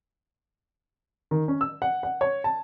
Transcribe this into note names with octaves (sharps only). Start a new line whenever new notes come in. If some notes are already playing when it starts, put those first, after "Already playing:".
D#3
C#4
E6
F#5
F#5
C#5
A5